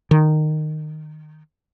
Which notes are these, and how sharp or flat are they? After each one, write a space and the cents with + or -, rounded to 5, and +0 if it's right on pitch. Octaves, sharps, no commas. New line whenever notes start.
D#3 -15